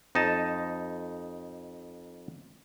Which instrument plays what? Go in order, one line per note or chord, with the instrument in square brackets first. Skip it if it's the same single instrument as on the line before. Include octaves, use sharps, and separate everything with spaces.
[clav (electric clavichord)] F2 D#4 D#5 A5